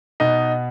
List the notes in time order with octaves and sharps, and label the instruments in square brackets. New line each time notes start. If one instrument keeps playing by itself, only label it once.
[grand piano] B2 B3 D#4